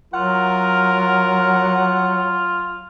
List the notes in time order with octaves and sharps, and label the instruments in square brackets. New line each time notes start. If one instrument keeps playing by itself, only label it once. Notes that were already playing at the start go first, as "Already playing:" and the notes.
[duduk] F#3 [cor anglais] F4 [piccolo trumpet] A#4 [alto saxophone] F#5